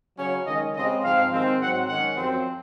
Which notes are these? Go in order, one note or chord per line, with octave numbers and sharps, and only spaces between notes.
C#3 F#3 C#4 C#5
D#3 G#3 C#4 D#5
C#3 G#3 C4 D#5
G#2 F3 C4 F5
D#3 G#3 C4
G#2 F#3 C4 F#5
D#3 G#3 C#4 F#5
F#2 F3 C4